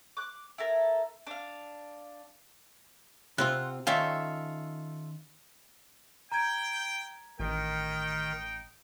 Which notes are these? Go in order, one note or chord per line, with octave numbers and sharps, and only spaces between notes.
D6 F#6
E4 A4 A#4
D4 F5
C3 C4 F4 F#5
D#3 C#4 F4 A4 E5 G5
G5 A#5 G#6
A1 D#3 D#4 G5